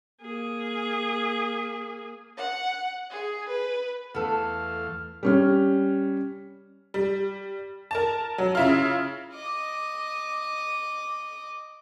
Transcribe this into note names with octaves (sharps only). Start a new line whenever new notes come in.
A#3 G#4
F#5
G#4
B4
E2 A3 B3 A4 F5
G3 C#4 F6
G3
A#4 A5
F#3
C#3 E4 F4
D#5 D6